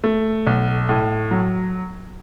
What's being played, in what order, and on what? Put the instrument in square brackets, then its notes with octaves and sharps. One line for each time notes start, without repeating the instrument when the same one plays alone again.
[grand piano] A3
B1
A2
F#3